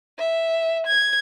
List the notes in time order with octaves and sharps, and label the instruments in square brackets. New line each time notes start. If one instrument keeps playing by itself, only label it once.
[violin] E5
G#6